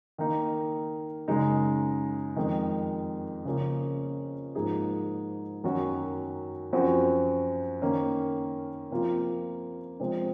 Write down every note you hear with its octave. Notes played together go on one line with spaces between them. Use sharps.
D#3 A#3 D#4
F#2 C#3 G#3 D#4
F2 D#3 G#3
C#3 F3 A#3 C#4 F4
G#2 F3 A#3 D#4 G#4
F#2 D#3 F#3 C#4 F#4
F#2 F3 C4 F#4
D#3 A#3 C#4
C3 F3 A#3 F4
C3 F3 G#3 C4